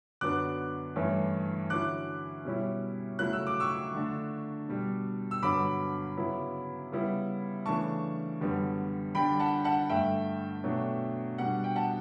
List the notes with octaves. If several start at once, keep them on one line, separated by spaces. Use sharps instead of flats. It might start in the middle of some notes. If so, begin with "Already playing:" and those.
F#2 D3 F#3 B3 D4 D6 F#6
G2 E3 A3 C#4 E4
D3 F#3 C#4 E4 D6 F#6
B2 G3 C#4 E4
C#3 F#3 A3 E4 F#6
E6
D6
C#6 E6
D3 A3 D4
B2 G3 D4
E6
G2 D3 F#3 B3 B5 D6
C#3 F#3 B3 E4
C#3 G3 B3 E4
C#3 E3 A3 D4 A5 C#6
F#2 D3 G3 B3
D3 G3 D4 G5 B5
F#5 A5
F#5 A5
G2 D3 A3 E5 G5
B2 F#3 A3 D4
B2 G3 D4 F#5
G5
F#5 A5